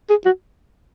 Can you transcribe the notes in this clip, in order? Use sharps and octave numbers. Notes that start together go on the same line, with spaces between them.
G#4
F#4